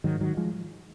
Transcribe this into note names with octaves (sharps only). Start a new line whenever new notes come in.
G#2 D#3 F#3
D#3 F#3
F3 G#3